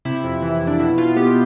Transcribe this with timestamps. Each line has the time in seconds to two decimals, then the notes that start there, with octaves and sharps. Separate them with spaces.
0.05 C3 E4
0.24 F2
0.42 E3
0.61 F2
0.67 D4
0.79 B2 E4
0.98 B2 F4
1.16 B3 G4